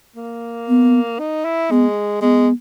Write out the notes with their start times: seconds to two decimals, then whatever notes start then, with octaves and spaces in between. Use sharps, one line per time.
0.16 A#3
0.68 B3
1.19 D#4
1.45 E4
1.70 G#3 B3
2.21 G#3 B3